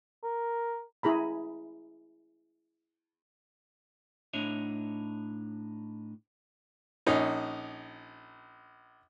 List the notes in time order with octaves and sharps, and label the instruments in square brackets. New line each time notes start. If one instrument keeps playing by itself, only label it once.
[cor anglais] A#4
[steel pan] E4 G#4 A#5 B5
[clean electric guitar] A2 D4 D#4 C#5 E5
[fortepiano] A#1 C#4 D#4